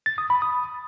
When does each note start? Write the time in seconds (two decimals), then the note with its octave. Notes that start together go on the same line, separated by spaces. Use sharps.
0.06 A6
0.18 D#6
0.30 B5
0.42 D#6